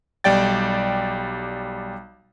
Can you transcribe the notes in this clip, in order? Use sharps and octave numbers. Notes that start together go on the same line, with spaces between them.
B1 G3 D5 G5 A6